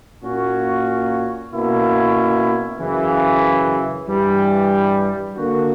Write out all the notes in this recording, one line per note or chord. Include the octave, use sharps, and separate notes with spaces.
A#2 A#3 C#4 F#4
B2 A#3 C#4 E4
F#2 C#3 E3
G2 E3 G3
D3 A#3 D4 F#4